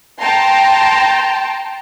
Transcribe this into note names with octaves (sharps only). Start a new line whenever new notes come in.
G5 A5 A#5 C6